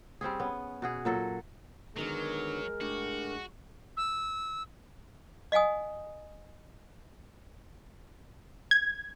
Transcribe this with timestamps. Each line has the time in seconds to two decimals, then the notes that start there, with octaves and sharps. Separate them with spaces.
0.21 G3 C4 C#4 G#4
0.39 B3 C#4
0.82 B2 F#4 G#4
1.05 A#2 F#3 A4
1.96 D3 D#3 F#3 G#3 B3 A#4
2.81 A2 D4 F#4 G4
3.97 E6
5.52 D#5 F5 F#5 G#5 D#6
8.71 G#6